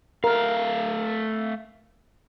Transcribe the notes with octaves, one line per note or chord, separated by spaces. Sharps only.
A3 A#4 F5